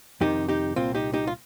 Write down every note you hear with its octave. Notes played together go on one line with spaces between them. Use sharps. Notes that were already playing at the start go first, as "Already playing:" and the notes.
F2 C3 D#3 D#4 G4
D#4 G4
C2 A#2 C4 F4
D#4 G4
D#4 G4
F4